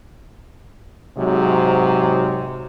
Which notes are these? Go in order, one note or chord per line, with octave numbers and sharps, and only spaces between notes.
G#2 C3 F#3